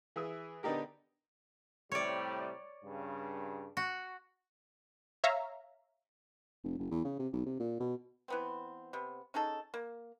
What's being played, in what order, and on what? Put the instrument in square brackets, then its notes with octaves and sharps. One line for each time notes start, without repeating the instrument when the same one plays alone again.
[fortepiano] E3 G#4 E5
D3 B3 D4 D#4 G4 A#4
[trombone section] A2 C3 G3 [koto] C#5 D5
[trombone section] G2 C#3
[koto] F#4
[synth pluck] C#5 E5 F5 A#5
[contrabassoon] F1
F#1
E2
C#3
C3
B1
C3
A#2
B2
[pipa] E3 B3 C4
C3 B3
C#4 D#4 G#4 A4
A#3